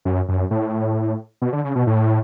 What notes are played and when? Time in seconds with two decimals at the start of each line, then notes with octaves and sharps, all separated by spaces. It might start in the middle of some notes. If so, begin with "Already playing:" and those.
0.05 F#2
0.29 F#2
0.51 A2
1.42 B2
1.53 D3
1.64 C#3
1.75 B2
1.87 A2